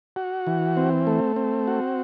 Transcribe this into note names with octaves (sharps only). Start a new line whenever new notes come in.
F#4
E3
C4
A3
C4
F#4